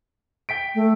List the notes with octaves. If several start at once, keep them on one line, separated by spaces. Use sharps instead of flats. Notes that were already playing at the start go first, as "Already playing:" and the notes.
G5 B6 D7
A3